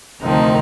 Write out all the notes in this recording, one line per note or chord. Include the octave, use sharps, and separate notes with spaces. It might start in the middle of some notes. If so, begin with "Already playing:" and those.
D2 C3 D#3 F3 C4 D#4